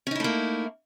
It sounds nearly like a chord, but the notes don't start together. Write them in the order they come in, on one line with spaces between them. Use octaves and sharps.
C#4 D#4 E4 A3 A#3